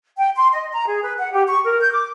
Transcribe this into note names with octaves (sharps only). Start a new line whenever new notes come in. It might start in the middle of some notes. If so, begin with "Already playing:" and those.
G5
C6
D#5
A#5
G#4
B4
F#5
G4
C#6
A#4
G6
D6